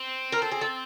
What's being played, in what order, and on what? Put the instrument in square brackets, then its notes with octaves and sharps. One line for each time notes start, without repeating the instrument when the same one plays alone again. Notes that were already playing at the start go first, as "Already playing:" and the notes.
Already playing: [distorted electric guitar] C4
[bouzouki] A#4
A4
G#4
A4